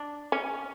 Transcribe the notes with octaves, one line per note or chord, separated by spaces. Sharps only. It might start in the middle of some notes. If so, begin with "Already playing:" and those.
Already playing: D4
C#4